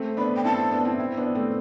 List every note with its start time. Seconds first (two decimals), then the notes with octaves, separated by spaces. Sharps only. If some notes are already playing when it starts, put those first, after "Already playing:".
Already playing: A3 C4
0.17 B3 D4 B5
0.36 G5
0.44 C4 E4 A5
0.71 B3 D4
0.85 C4 E4
0.99 C4 E4
1.17 B3 D4
1.35 A3 C4